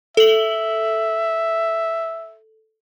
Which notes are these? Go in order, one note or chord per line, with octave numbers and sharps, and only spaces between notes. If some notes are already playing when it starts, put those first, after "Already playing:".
A4 E5 F#7